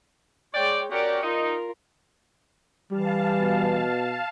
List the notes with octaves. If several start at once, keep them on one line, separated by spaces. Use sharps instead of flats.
G#3 C#5 D5 G5
C#4 F#4 G4 A#4 D5
D#4 F4 A#4
E3 G3 F5 A5
B2